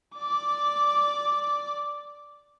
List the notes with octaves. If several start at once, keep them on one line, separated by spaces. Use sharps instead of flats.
D5 D6